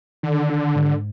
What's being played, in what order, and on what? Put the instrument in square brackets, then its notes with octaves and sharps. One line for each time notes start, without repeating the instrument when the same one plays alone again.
[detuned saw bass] D3 [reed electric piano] D#3
[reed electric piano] D4
G#2